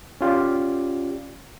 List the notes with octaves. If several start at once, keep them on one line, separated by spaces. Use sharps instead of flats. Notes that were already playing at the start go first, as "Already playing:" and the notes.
C#4 F4 G4 D5